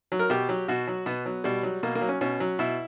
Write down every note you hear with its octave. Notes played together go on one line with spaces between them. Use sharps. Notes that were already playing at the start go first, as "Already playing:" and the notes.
F#3
A#4
B2 G4
F#3
B2 F#4
F#3
B2 B3
F#3
B2 G3
F#3
B2 A#3
A#3
F#3
C#4
B2 C#4
F#3
B2 E4